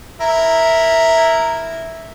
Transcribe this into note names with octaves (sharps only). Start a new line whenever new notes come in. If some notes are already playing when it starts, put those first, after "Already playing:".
E4 A#4